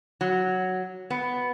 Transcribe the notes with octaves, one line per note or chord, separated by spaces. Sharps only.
F#3
B3